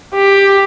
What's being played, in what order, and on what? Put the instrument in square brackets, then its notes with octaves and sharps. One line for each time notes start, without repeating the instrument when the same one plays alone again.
[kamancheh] G4